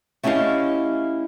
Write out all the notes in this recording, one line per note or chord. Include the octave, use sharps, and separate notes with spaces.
A3 C#4 E4 G4 D#5 F5